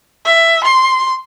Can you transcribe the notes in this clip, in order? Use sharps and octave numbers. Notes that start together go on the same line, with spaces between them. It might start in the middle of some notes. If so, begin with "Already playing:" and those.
E5
C6